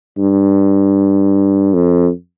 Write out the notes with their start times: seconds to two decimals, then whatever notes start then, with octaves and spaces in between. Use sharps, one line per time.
0.18 G2
1.74 F2